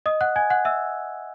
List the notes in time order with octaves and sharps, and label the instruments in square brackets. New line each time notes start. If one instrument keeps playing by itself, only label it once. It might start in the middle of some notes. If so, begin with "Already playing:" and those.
[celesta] D#5 D#6
F#5 F#6
G#5 G#6
F#5 F#6
E5 E6